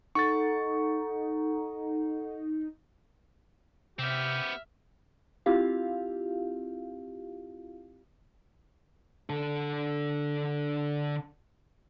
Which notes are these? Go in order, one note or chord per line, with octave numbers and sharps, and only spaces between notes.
D#4 A4 F#5 C#6 A6
C3 B3 C4 G4 E5 F6
C4 E4 F4 G4 F5
D3 A4